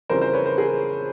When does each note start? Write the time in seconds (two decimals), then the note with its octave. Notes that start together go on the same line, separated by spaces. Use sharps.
0.09 F2 C#3 E3 G3 A#4 C5
0.21 A#4 C5
0.33 B4 C#5
0.46 A#4 C5
0.58 G#4 A#4